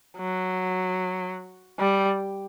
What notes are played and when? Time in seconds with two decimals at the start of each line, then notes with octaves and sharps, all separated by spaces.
0.18 F#3
1.79 G3